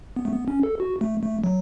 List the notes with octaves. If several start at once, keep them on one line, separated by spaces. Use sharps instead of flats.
B3
A3
B3
C#4
A4
F#4
A3
A3
F#3